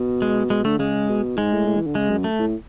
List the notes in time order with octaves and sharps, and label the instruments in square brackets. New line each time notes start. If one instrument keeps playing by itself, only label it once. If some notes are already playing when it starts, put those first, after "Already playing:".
Already playing: [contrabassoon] B2
[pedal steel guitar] G#3
[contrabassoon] B2 [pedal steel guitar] G#3
[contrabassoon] D3 [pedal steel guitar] A3
[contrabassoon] C#3 [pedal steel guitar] G#3
[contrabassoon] B2
[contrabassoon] G#2 [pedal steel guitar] G#3
[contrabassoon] A2
A2
E3
D3
[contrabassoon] C#3 [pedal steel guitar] G#3
[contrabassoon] F#2
[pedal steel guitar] A3
[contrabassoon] A2